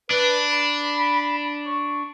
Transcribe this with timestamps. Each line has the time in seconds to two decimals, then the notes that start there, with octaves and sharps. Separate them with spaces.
0.10 D4 B4
0.52 B5
1.65 C#6